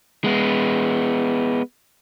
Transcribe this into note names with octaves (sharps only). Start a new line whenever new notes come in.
G#3 B3